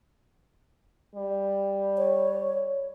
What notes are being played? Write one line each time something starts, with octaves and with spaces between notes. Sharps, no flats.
G3
C#5